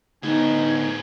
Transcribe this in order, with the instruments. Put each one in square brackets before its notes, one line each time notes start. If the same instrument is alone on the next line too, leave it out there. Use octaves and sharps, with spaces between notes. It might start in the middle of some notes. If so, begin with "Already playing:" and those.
[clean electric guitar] D2 B3 [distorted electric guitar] A2 G#4 [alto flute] D#4 [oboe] G#5